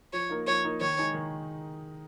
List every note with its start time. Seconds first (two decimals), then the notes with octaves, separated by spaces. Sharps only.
0.13 F3 C#5
0.29 A#3 D#4 A#4
0.47 F3 C#5
0.64 A#3 D#4 A#4
0.81 D#3 C#5
0.98 G#3 D#4 G#4
1.14 D#3